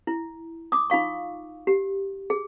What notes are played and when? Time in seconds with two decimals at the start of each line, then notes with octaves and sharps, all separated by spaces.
0.07 E4
0.72 D6 D#6
0.90 D#4 F4 F5 C#6
1.67 G4
2.30 G#4